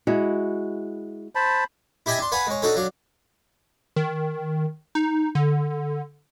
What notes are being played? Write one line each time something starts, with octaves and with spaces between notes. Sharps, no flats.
G#3 E4 F#4
C5 A5 B5
E4 G4 D#5 E5 G#5 A5
D4 C6
B4 F5 F#5 G#5
G#3 C#5
D4 D#4 F#4 A4 C#5
F#3 D4 F5
D#3
D#4
D3